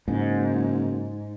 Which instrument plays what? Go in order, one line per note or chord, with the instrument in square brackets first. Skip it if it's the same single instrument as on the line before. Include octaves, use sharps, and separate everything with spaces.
[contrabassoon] F#1 [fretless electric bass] G#2